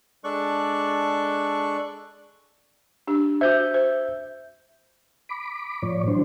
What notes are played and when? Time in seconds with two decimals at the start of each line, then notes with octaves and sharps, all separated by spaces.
0.24 G#3 D4 A4 D5 C#6 F#6
3.07 D4 G4
3.41 F#4 C5 E5 G6
3.74 C5
5.29 B5 D6
5.82 A2 F3 C#5 D5
6.08 E3 F#3 D4 C5